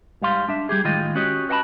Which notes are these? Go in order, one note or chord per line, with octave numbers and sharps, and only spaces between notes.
G#2 G3 F5 C6
D4 E5
G3 G4 G#4
A2 D#3 G#3 F4 D#5 G5
C#4 F#4 G4 C#5 D#5
B4 D#5 F#5 G5 A5 B5